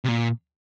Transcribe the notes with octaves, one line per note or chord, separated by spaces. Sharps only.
C3
A#2